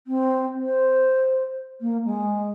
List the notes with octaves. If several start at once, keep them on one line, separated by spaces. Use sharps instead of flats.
C4
C5
A#3
G#3